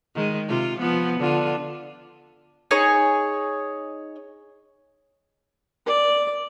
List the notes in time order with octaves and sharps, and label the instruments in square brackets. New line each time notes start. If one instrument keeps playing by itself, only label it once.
[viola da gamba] D#3 G#3
C3 F4
F3 B3
D3 F4
[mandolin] D#4 G#4 C#5
[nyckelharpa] D5